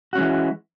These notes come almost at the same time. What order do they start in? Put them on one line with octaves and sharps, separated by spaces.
F#4 C#4 G#3 E3